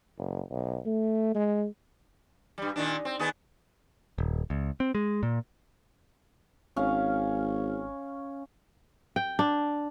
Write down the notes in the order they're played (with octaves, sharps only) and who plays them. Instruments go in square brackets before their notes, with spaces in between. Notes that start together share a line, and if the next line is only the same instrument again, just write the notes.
[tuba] F#1
B1
A3
G#3
[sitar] G2 G3
A#2 D#3 D4
C4
D#3 B3 G#4
[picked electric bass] D#1
C#2
C4
G#3
A#2
[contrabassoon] G#1 [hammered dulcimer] C#4 F5
[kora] G5
D4